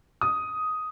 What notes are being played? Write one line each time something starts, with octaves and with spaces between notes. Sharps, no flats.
D#6